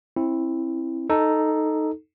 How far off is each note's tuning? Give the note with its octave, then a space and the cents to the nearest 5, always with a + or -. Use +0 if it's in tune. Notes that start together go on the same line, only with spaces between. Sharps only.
C4 +30 E4 +0
D#4 +0 A4 +0